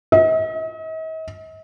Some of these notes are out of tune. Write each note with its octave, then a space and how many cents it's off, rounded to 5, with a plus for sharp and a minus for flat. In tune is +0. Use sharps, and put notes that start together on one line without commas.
D#5 +45